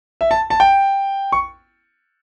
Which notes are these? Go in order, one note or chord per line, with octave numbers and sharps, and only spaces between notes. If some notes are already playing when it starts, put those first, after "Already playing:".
E5
A5
A5
G5
C#6